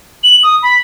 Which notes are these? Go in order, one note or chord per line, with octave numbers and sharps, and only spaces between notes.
F#7
D#6
B5